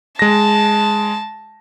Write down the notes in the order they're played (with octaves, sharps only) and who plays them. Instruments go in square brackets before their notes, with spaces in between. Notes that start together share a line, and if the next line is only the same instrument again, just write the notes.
[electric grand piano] G#3 A#6 [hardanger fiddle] A5